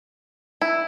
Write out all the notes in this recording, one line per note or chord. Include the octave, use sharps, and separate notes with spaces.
E4